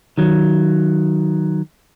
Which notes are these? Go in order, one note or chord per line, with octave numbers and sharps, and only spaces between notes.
D#3 F#3